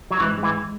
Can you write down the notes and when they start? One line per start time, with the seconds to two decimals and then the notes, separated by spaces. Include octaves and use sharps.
0.11 F#3
0.20 G#2 E3
0.37 G#3
0.43 E3